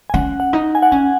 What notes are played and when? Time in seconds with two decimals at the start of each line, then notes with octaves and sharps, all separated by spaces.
0.10 G#5
0.14 C#4 F#5
0.40 F#5
0.53 D#4
0.75 G#5
0.83 F#5
0.91 C#4 G#5